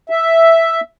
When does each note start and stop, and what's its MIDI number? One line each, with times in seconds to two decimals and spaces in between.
0.10 0.81 76